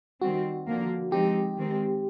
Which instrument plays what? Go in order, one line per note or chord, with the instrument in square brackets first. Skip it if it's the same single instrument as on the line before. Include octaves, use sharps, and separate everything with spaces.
[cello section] D#3 G3 C4 [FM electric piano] F#4
[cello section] D3 F3 A#3
[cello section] F3 G#3 C4 D#4 [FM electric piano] G4
[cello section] D#3 G#3 C4